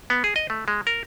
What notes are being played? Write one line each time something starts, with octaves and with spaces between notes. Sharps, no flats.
B3
G#4
D#5
A3
G#3
A#4